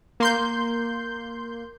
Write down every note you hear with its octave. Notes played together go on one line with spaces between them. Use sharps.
A#3 C6 G6